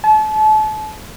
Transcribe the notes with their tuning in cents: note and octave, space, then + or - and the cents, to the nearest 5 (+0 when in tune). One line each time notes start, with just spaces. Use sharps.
A5 -35